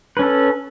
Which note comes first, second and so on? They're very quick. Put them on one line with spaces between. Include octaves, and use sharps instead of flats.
B4 C#4 A4